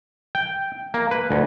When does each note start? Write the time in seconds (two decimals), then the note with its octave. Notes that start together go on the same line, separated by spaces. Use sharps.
0.35 G5
0.94 A#3
1.11 B4
1.31 D2